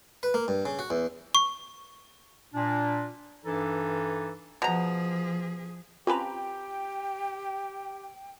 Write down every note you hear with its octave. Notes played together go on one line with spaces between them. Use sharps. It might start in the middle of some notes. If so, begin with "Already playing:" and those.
B4
A#3
G2
C#3
F#4
E2
C#6
A#2 D4
G2 E3 D4 D#4 A4
B2 F3 G#4 A#5
C4 C#4 F4 G4 B4 G5 A5 A#5